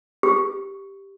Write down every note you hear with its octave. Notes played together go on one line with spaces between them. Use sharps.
G4